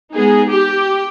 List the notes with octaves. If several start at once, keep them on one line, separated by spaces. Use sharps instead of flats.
G#3 B3 D#4 G#4
G4